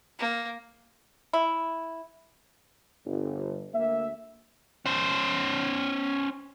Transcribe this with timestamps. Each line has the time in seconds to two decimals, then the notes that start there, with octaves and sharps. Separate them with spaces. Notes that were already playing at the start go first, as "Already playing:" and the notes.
0.19 A#3
1.33 E4
3.04 G1
3.74 D2 A#3 E5
4.86 C#4 C5